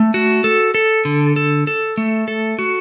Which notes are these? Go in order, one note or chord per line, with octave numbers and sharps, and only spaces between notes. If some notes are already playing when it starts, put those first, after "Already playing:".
Already playing: A3
F#4
A4
A4
D3
A4
A4
A3
A4
F#4